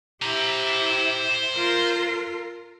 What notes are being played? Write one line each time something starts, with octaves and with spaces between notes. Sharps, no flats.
E4 G4 C5 A#5
F4 A#4